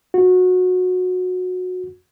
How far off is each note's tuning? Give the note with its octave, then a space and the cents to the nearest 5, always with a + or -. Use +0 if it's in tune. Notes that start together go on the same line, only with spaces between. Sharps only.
F#4 -20